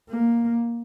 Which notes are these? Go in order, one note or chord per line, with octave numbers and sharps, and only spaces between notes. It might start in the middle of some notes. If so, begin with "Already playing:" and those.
A#3